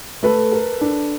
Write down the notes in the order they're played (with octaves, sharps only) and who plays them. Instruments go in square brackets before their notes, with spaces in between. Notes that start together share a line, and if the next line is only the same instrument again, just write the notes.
[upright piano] A3 [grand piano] A4 B4
[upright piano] A#4
D4